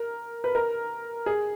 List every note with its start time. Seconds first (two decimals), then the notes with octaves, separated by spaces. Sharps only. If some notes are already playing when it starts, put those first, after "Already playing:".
Already playing: A#4
0.44 B4
0.55 A#4
1.26 G#4